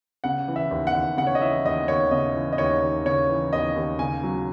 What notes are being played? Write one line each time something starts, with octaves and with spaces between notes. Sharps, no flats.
C#3 F#5
E3
E5
D#2
F#5
D#2
C#3 F#5
C#5
D#5
E3 E5
D#2 D#5
D#2 C#5
C#3 D#5
E3
D#5
D#2 C#5
D#2
C#3 C#5
E3
D#2 D#5
D#2
C#3 G#5
F#3